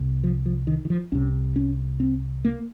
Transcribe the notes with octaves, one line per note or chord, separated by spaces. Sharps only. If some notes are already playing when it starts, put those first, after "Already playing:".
Already playing: C2 C3
F3
F3
D#3
D#3
F3
C2 C3 C#4
C#4
C4
A#3